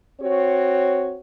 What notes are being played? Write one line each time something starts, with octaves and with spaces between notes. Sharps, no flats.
C4 F#4 C#5